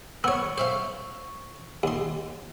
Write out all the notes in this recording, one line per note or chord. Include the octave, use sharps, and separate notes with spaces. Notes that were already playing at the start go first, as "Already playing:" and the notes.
B3 C#5 C#6 E6
C5 E5 F5
D#2 C6